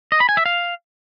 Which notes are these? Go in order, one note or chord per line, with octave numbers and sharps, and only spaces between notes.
D#5
B5
G#5
E5
F5